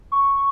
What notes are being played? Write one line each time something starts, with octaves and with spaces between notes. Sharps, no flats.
C#6